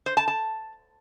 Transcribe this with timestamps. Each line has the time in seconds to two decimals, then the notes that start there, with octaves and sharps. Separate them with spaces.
0.06 C5
0.17 A5
0.28 A5